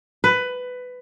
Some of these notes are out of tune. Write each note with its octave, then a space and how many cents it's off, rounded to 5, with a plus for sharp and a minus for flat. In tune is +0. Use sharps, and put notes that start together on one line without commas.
B4 +15